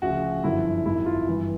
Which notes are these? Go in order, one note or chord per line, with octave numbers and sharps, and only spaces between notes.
D2 C#3 F3 F#4
G1 F#2 D3 F3 E4
G#1 F#2 D#3 E4
F4
G1 G2 E3